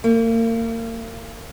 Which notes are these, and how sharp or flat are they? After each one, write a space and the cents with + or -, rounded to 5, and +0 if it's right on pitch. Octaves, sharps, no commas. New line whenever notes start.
A#3 -35